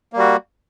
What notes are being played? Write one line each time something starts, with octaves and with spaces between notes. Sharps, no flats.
G3 A#3 F#4